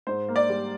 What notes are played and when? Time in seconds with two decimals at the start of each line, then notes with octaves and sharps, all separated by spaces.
0.07 G#2 C5
0.28 A#3
0.36 D5
0.50 G3